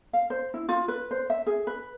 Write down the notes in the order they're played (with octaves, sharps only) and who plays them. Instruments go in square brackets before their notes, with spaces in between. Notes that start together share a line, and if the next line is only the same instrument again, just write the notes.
[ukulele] F5
C5
E4
F4
B4
C5
E5
G#4
B4